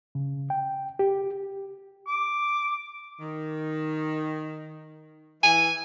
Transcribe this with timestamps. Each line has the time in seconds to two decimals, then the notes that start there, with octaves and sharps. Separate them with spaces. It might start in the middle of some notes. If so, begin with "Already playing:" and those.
0.15 C#3
0.50 G5
0.99 G4
2.07 D6
3.19 D#3
5.43 E3 G#5